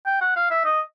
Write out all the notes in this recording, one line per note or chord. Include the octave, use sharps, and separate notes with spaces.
G5
F#5
F5
E5
D#5